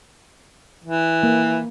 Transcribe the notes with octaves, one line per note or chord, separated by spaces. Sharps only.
E3
A#3